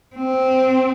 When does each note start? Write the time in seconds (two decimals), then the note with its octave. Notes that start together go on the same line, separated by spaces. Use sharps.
0.16 C4